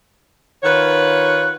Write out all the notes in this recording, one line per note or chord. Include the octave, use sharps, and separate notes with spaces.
D#3 F4 B4 C#5 F#5